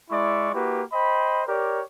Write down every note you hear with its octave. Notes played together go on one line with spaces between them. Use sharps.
G#3 E4 D5 E5 C#6
A#3 E4 F#4 G4 B4
C5 D#5 G5 B5
G4 A#4 C#5 D5